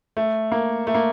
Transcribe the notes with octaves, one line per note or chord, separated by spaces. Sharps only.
A3
A#3
A3
A#3